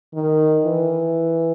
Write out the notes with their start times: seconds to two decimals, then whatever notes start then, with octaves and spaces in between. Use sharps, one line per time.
0.14 D#3
0.64 E3